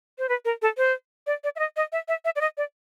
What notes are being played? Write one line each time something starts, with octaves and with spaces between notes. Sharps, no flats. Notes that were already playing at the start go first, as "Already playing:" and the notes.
C5
B4
A#4
A4
C5
D5
D5
E5
D#5
D#5
E5
E5
E5
D5
D#5
D5